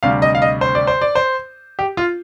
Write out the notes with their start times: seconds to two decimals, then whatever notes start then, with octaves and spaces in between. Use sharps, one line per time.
0.03 D2 C3 G3 F5
0.22 D#5
0.35 F5
0.42 D#5
0.61 C5
0.75 D5
0.87 C5
1.01 D5
1.15 C5
1.79 G4
1.97 F4